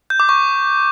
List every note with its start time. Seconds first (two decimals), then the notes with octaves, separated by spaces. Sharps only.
0.10 G6
0.20 D6
0.29 C#6